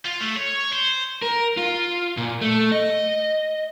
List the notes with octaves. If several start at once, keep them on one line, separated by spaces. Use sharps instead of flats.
F4
A3
C#5
C5
A#4
F4
A#2
A3
D#5